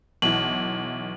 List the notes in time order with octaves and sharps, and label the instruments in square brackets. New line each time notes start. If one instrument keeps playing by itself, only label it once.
[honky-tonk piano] B1 E3 [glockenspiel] F#7